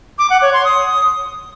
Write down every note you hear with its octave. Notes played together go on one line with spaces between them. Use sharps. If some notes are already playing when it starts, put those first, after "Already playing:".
D6
F#5
C#5
C6
D#6